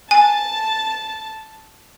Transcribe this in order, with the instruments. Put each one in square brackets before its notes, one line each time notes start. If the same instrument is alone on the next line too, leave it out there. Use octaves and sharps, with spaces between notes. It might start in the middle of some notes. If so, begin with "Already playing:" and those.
[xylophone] G#5 [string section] A5